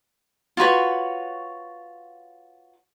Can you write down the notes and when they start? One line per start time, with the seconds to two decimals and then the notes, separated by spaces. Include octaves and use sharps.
0.57 F4 F#4 B4 C#5